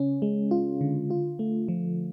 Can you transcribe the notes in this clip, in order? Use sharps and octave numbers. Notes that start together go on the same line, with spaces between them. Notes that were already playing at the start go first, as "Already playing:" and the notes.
Already playing: C#3 C#4
G#3
F4
D3
F4
A3
F3